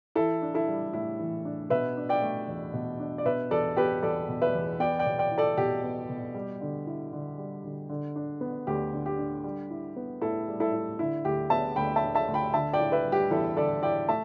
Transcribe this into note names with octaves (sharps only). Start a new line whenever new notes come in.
E3 E4 A4
D4
E4 A4
G3
A2 E4
E3
D4
B2 B4 E5
D4
D5 G5
A3
E2
B2
D4
D5
B2 B4 E5
E2 A4 D5
B3 G4 B4
E2 A4 D5
B2
B4 E5
E2
B3 D5 G5
D5 G5
B2
D5 G5
E4
A4 D5
B2 G4
B3
B2
G3
D3
E4
D3
G3
D3
D3
D4
B3
D2 G4
D3
G4
D4
G3
E4
B3
A2 E4 A4
G3
E4 A4
E4
D3 E4
D2 G4
B3 E5 A5
D2 G5 B5
E5 A5
D3
E5 A5
D2
G5 B5
D3 E5 A5
D5 G5
E4
B4 E5
G3
G4
E2 E4 A4
D3 A4 D5
E4 D5 G5
A3 E5 A5